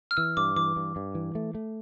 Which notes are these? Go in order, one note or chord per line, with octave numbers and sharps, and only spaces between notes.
F6
E3 E6
G2 D6
E3 D6
G2
G2
E3
A3
A3